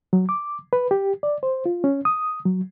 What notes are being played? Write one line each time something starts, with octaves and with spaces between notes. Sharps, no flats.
F#3
D6
B4
G4
D5
C5
F4
C#4
D#6
F#3